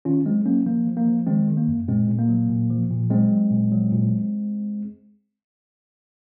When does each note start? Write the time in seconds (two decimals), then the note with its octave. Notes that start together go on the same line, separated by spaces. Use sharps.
0.05 D#3 C#4 F4
0.26 F#3 G#3 C4
0.46 F#3 A#3 C#4
0.66 F3 A#3
0.87 F3
0.97 A#3
1.07 F3
1.27 D#3 G#3 C4
1.48 D#3
1.58 A#3
1.68 F#2
1.88 A#2 G#3 C4
2.08 A#2
2.19 A#3
2.29 F#3
2.49 A#2
2.70 F3
2.90 A#2
3.10 F#3 G#3 C4
3.31 F#3
3.51 A#2
3.72 F#3
3.92 A#2